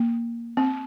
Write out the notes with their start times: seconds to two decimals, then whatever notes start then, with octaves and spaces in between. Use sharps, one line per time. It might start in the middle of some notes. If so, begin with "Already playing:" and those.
Already playing: A#3
0.57 C4